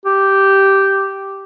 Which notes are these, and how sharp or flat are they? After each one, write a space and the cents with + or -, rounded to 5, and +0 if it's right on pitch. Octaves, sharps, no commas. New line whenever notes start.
G4 -5